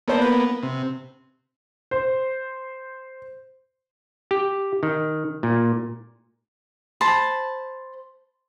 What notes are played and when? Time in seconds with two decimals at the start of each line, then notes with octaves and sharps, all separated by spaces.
0.08 A#3 B3 A4 C5 D5
0.22 B4
0.63 C3
1.91 C5
4.31 G4
4.83 D#3
5.43 A#2
7.01 C5 A5 B5